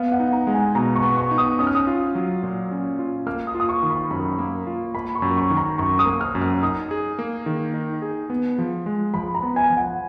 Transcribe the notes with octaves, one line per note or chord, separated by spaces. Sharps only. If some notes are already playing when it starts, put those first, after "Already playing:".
Already playing: B3 F5
F#5
D#4
A#5
G#3
G#5
B2 A#5
C#6
B3
C#6
D#4
D#6
C#4 D#6
F6
D#6
F4
F#3
A#2
C#4
F4
A#3 F6
D#6
F4
D#6
C#6
D#3
B5
F#2 B5
A#3
F4
A#3 B5
C#6
F#2
C#6
D#3
A#5
F#2 C#6
D#6
A#3
F6
F#2
F6
D#4 D#6
G#4
A#3
D#3
D#4
G#4
B3
F3
G#3
F3 B5
A#5
B3
G#5
F3
F#5